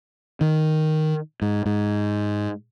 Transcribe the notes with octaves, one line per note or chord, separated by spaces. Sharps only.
D#3
G#2
G#2